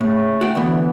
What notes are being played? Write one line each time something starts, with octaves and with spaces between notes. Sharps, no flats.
A2 C#3 A3
F#4 G5
D2 D3 E3 B3